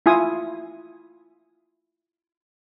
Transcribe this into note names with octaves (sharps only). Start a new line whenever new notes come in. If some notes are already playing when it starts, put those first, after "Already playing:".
E4 F4 G#5 D#6